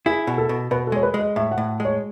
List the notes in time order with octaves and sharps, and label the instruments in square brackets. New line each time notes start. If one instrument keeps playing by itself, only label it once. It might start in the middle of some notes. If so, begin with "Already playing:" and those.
[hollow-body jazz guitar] E4 [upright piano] G#4
[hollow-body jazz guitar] B2
[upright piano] A4
[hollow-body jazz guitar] B2
[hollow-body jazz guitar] B2 [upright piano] B4
[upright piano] A4
[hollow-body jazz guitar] G#3 [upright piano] C#5
[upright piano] B4
[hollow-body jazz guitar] G#3
[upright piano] D#5
[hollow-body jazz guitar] A2 [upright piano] E5
[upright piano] F#5
[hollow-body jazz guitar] A2
G#3
[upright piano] C#5